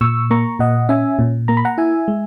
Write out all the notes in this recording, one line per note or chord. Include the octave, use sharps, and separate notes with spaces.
A#2 C#6 E6
A#3 A#5 C#6
A#2 D#5 F#5
C#4 E5 G#5
A#2
A#3 A#5
B5
F#5 A#5
E4 E5 G#5
G#3